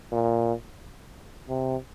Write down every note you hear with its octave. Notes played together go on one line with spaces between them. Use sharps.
A#2
C3